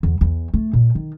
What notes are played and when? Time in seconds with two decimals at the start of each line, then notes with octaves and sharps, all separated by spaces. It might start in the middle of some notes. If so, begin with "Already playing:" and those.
0.03 E2
0.21 E2
0.54 A3
0.73 A#2
0.95 D#3